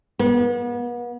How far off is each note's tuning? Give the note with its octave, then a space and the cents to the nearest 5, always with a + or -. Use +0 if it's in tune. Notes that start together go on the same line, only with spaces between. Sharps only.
B3 -40